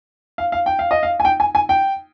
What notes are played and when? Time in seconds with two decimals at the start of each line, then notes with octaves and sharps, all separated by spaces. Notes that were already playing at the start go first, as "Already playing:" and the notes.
0.38 F5
0.52 F5
0.66 G5
0.79 F5
0.91 D#5
1.03 F5
1.20 G#5
1.25 G5
1.40 G#5
1.55 G#5
1.69 G5